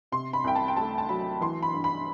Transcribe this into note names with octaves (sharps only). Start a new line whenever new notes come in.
C3 C6
B5
C2 G5
A5
G5
A3 A5
A5
F#3 B5
E3 C6
B5
G2
B5